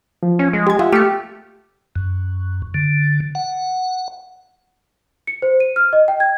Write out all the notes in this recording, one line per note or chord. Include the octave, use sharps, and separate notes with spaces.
F3
C#4
G#3
G4 G#6
F4 G4 E5 F#5
A3 G4 E6 F6 C#7
F#2
D3
F#5
C#7
C5
D#7
F6
D#5
G5
G#6